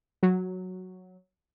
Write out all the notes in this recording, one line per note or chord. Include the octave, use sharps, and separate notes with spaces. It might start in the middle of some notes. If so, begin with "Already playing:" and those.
F#3